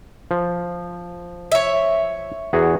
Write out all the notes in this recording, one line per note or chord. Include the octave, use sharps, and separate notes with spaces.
F3
C#5 E5
E2 F#4 G#4